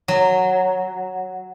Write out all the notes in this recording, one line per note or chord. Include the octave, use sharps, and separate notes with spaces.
F#3